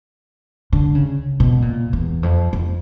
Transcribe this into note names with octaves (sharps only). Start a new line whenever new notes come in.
D3
C#3
B2
A#2
E2
F2
F2